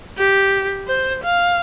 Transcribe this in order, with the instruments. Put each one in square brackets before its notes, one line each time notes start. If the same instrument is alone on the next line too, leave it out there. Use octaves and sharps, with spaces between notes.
[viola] G4
C5
F5